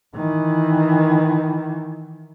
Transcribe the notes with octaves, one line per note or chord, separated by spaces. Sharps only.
D#3 E3